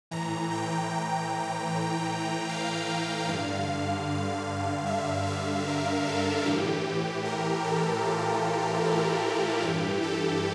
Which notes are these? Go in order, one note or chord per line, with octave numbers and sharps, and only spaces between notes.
A2 E3 A#5
G5
F5
G2 D3 F5
E5
E5
A#4
A4
A2 E3 G4
A#4
A4
F4
E4
E4
G2 E3 G4
A4